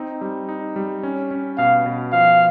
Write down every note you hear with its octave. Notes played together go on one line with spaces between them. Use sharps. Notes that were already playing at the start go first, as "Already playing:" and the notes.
Already playing: C4 D#4
G3
D#4
G3
C#4
C#4
B2 F5
B2
F3 F5